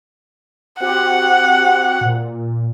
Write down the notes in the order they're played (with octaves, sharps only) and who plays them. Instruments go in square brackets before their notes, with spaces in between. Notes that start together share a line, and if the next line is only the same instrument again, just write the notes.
[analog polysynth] C4 F#4 G4 [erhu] F#5
[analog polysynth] A#2